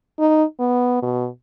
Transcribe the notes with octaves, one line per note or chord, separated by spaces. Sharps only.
D#4
B3
B2